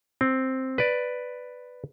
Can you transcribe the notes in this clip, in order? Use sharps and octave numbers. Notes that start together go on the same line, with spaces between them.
C4
B4 D5